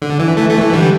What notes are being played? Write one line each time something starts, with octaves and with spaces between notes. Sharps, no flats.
D3
E3
E3 A3
E3 A3
E3
D3 G3